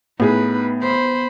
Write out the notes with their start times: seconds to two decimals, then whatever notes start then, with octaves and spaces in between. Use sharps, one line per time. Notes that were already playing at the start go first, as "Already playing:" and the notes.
0.20 A2 B3 D#4 G#4 B4
0.82 C5 B5